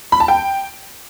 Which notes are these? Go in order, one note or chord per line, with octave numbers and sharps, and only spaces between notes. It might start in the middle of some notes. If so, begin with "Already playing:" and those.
B5
A5
G5